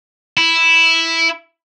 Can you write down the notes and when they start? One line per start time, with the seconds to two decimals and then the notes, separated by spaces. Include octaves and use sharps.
0.37 E4